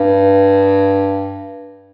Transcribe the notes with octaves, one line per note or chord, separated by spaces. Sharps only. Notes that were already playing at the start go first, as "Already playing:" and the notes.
Already playing: G2